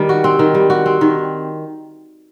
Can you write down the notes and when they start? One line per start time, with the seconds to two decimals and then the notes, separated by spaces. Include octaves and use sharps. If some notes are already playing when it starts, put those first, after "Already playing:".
Already playing: D#3 G3
0.09 F#4
0.24 C4
0.39 D#3
0.55 G3
0.70 F#4
0.86 C4
1.01 D#3